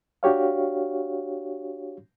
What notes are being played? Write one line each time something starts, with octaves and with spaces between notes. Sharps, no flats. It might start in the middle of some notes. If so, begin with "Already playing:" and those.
D4 F#4 G4 C#5 F5